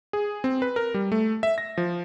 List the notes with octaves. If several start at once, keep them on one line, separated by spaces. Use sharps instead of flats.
G#4
C4
B4
A#4
G3
A3
E5
A#6
F3